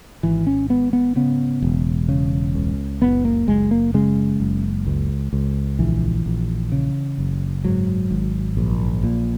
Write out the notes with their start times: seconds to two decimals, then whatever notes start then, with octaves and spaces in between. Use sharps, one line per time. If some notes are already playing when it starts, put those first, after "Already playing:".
0.23 G#1 E3
0.47 C#4
0.70 G#2 B3
0.93 B3
1.16 C#3 B3
1.62 E1
2.09 C#3
2.55 C#2
3.02 F#1 B3
3.25 A#3
3.47 F#1 G#3
3.71 A#3
3.94 C#3 G#3
4.40 F#1
4.87 C#2
5.33 C#2
5.79 A#1 E3
6.26 A#1
6.72 C#3
7.18 F#1
7.65 G#2 F#3
8.11 G#1
8.57 A#1
9.04 A#2